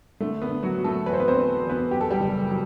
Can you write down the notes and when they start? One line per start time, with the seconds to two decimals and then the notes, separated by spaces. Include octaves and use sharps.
0.20 D3 A3
0.42 B3
0.49 D3
0.63 F#3 F#4
0.78 F#3
0.84 A3 A4
1.06 E2 B4
1.13 C5
1.20 B3 B4
1.27 C4 C5
1.34 D3
1.63 E2
1.70 B3 B4
1.91 F#2 G4
2.01 A4
2.10 G3 G4
2.20 F#1
2.49 F#3